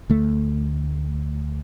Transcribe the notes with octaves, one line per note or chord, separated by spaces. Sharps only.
D2 A3